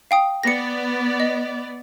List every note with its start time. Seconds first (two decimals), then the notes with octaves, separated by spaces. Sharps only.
0.11 F5 G5 D#6
0.43 B3 D5 A#6 C#7
1.20 D#5